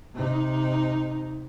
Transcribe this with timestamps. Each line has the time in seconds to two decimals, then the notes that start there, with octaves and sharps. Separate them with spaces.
0.14 C3 D#4